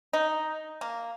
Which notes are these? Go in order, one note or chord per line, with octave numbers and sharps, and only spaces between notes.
D#4
A#3